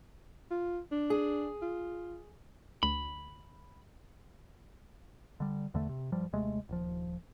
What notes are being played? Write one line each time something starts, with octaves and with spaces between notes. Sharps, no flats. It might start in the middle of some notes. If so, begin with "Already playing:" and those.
F4
D4
G#4
F4
D2 B5
D3 G3
E2 D3 A3
C3
G2 F3 G3
D#2 C3 G#3 A3
D#1 F3